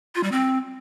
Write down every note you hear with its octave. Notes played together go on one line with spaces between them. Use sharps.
F4
G3
C4